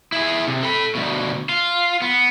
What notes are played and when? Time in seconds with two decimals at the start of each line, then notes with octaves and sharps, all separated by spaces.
0.12 E4 G#4
0.47 C3
0.63 A4 B5
0.95 D2 B2
1.49 F4
2.02 B3